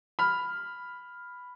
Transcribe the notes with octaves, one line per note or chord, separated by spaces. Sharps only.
B5 F6